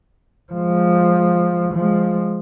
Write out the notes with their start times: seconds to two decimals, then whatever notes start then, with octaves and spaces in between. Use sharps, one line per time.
0.53 F3 G#3
1.74 F3 G#3